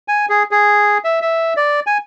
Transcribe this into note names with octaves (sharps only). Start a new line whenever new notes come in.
G#5
G#4
G#4
E5
E5
D5
G#5